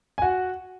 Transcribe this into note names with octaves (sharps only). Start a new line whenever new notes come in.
G#5
F#4 F#5